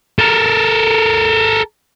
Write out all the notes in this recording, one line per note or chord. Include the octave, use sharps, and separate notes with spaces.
A4 A#4